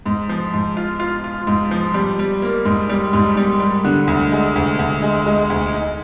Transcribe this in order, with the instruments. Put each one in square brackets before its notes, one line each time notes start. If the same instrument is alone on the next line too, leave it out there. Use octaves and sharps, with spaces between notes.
[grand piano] G#2
F3
G#2
F4
F4
F4
G#2
F3
G3
G3
A#3
G#2
G3
G#2
G3
G3
D3
D2
G#3
D2
D2
G#3
G#3
D2
D#4